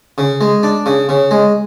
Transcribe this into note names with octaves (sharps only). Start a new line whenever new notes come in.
C#3
G#3
D4
C#3
C#3
G#3